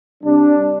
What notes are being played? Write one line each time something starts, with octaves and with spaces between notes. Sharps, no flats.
C3 G3 D4